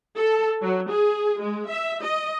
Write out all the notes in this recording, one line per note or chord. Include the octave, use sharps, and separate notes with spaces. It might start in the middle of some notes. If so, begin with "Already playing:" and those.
A4
F#3
G#4
G#3
E5
D#5